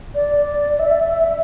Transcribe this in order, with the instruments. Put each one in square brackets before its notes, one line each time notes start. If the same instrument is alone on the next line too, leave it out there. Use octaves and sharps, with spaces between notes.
[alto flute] D5
E5